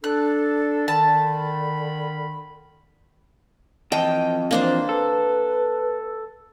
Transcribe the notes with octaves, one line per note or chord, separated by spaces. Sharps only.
D4 A4 F#6
D3 D#3 A5 B5
F2 E3 D#5 G5 A5
E3 A#3 D4 C5
A4 B4